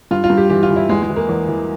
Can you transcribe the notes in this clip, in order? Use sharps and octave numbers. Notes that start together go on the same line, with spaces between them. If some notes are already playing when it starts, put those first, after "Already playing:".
G2 F4
F4
G2
G4
E3 G4
F4
E3
E4
E2 G#3
G#3
E3
A#3
E2
E3